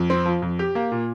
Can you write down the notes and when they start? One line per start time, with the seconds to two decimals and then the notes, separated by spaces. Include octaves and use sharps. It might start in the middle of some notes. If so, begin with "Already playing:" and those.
Already playing: F2
0.10 C4
0.25 F3
0.42 F2
0.59 G4
0.75 A#3
0.91 A#2